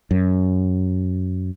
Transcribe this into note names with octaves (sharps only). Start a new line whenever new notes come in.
F#2